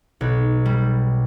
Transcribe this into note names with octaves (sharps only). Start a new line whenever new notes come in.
B1
G3